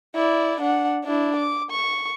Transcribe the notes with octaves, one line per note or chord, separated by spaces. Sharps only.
E4 D5
D4 F#5
D4 E4
D6
C#6